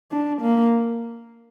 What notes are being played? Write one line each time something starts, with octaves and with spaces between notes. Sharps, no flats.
D4
A#3